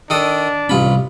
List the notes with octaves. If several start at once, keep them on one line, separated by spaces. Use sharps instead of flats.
D#3 D4 A4 D#6
A1 C3 G3 C#4 F4 B5